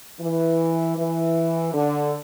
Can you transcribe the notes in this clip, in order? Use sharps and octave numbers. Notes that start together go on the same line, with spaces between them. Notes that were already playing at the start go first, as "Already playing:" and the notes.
E3
E3
D3